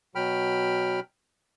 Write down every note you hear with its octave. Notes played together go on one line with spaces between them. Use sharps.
B2 F#3 G5 B5 F6